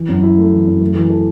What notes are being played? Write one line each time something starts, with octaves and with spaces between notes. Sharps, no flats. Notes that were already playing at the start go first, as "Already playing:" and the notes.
Already playing: E3
F#2
E4
A3
E3
F#2
A3
E3
A4